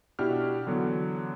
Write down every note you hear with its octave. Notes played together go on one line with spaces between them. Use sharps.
B2 D4 E4 F#4 G4 F6
D3 E3 F#3 B3